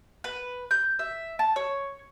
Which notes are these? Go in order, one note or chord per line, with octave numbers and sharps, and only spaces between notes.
B4
G6
E5
A5
C#5